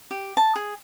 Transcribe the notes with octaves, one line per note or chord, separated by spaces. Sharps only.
G4
A5
G#4